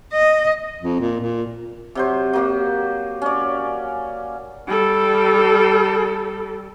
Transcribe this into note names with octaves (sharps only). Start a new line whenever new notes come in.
D#5
F2
A#2
A#2
C3 F#3 C5
F#3 A#3 G4
C#4 D5
G3 A4